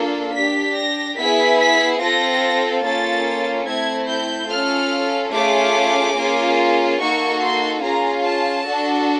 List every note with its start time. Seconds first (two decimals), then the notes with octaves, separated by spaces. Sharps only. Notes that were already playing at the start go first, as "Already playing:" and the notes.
Already playing: A#3 D4 F4 A4
0.34 D4 G4 B6
0.75 A#6
1.17 B3 E4 G#4 B6
1.59 B6
2.00 C4 F4 A4 A#6
2.83 A#3 C#4 F4 A4 A6
3.67 A3 C4 E4 G#6
4.08 G6
4.49 C#4 F4 A4 F6
5.32 A3 C#4 F4 G#4 D6
6.15 A#3 C#4 F4 G#4
6.98 A#3 D#4 F#4 A4 C#6
7.41 C6
7.82 C#4 F4 G#4 A#5
8.23 A5
8.66 D4 F#4 A4